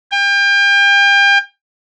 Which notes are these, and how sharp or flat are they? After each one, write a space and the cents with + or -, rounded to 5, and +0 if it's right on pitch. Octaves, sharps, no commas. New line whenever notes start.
G5 +35